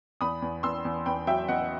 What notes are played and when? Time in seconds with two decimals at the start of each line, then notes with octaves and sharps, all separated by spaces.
0.21 E2 B5 D#6
0.42 E2
0.63 E2 C6 E6
0.85 E2
1.06 E2 G5 B5
1.27 F#3 E5 G5
1.48 E2 D#5 F#5